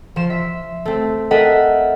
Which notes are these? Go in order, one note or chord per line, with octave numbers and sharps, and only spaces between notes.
F3 C6 E7
E5
A3 C4
A4 A#4 D#5 E5 F#5 G5